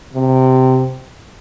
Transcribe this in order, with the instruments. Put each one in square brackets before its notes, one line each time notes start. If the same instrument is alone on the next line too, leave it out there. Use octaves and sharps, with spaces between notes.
[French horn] C3